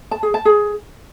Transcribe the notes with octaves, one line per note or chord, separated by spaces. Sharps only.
A5
G#4
A5
G#4